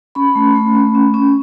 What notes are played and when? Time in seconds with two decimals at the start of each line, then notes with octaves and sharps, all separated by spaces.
0.15 C#4 B5
0.36 A3
0.55 A3
0.75 C#4
0.95 C#4
1.14 C#4